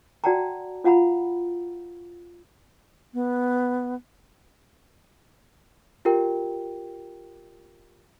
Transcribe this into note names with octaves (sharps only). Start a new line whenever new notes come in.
F#4 D5 F#5 G5 A5 A#5
F4 F5 F#5 A#5 B5
B3
F4 G4 A#4 G5